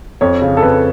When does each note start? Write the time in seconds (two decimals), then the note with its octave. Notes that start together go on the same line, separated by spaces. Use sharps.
0.21 F2 C#5
0.42 C#3
0.57 A4
0.63 F2 B4